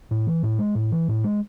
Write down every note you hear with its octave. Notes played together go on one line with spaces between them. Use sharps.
A2
E3
A2
G#3
A2
E3
A2
G#3